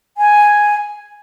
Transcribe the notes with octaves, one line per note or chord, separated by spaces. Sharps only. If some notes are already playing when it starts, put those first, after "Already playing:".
G#5